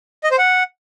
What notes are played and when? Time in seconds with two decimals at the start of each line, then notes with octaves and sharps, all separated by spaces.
0.24 D#5
0.31 C5
0.38 F#5